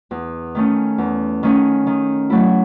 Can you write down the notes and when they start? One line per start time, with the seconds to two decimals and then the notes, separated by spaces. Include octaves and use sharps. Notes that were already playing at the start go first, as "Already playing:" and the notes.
0.11 E2
0.55 D#3 A3 C#4
0.98 E2
1.43 D#3 A3 C#4
1.87 D#3
2.30 F#3 A3 E4